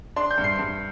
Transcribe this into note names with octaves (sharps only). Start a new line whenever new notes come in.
D4 C6
G6
G2
C7
G2